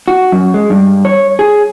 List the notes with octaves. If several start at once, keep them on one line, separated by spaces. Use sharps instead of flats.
F#4
F#2
G#3
G2
C#5
G#4